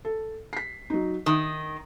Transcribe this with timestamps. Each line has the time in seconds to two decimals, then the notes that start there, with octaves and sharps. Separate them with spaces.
0.05 A4
0.53 B6 C7
0.90 F#3 D#4
1.26 D#3 D#6